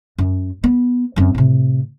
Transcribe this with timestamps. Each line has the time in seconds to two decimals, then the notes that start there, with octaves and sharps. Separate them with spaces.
0.18 F#2
0.64 B3
1.16 F#2 C4
1.35 A2 C3